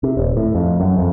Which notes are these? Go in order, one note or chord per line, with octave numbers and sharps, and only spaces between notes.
C3
D#1
A2
F2
F#2
F2